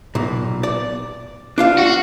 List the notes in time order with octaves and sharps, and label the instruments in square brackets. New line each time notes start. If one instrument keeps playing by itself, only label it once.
[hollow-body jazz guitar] B1 A#2
D5
D4 F4 F5
[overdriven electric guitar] F#4